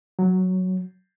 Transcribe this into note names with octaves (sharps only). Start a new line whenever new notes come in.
F#3